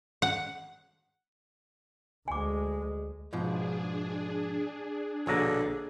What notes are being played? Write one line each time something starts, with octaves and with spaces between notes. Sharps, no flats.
F#5
D2 G#3 G#5 D6
G#2 B2 F3 D4 G#4
A#1 B2 D3 C#5 A#5